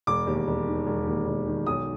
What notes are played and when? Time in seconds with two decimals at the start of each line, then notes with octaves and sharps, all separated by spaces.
0.07 E1 D6
0.27 D#2
0.47 E1
0.67 D#3
0.87 E1
1.06 D#2
1.26 E1
1.47 D#3
1.66 B1 D#6